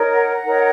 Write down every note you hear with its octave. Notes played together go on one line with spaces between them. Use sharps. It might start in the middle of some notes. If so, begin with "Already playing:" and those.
Already playing: D#4 A#4 C#5
F#5 A#5
D#4 A#4 C#5